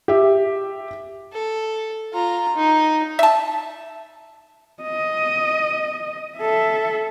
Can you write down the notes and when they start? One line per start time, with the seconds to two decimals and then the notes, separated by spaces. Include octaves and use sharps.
0.08 G4 E5
1.33 A4
2.13 F4 A#5
2.56 D#4
3.19 E5 A5
4.83 D#5
6.38 A4 E5